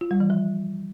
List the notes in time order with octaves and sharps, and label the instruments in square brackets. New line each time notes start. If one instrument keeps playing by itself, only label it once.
[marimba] F4
G3
E3
F3